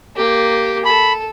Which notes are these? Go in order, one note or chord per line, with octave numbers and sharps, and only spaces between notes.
A#3 G4
A4 B5